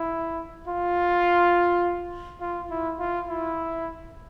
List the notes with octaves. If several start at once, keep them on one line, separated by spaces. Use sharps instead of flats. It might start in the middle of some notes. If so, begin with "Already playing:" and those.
Already playing: E4
F4
F4
E4
F4
E4